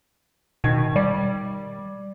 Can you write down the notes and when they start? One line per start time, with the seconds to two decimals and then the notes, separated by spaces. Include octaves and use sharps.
0.64 B2 D#3 G#6
0.96 G3 D5